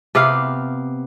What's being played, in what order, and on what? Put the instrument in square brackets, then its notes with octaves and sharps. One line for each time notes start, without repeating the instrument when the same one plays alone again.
[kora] C3 B3 G4 F5